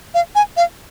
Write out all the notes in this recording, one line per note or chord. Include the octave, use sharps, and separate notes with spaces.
F5
G#5
F5